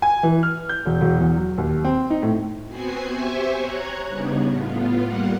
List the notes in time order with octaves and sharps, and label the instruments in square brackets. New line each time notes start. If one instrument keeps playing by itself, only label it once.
[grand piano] G#5
E3
F6
G6
E1
E1
E2
F#3
D#2
C4
D#4
A2
[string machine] B3 C4 F#4 G#5 C7
G4 C5 E5 G#5 C#6
C#5 A#5 F#6 G#6
C#3 G3 B3 D4 D#4
A2 B3 F4
G3 A#3 F#5